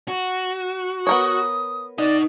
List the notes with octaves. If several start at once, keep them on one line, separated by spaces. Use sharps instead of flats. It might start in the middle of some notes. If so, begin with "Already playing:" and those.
F#4
B3 A#4 C#5 D#6
D#4 B4 D5 D#5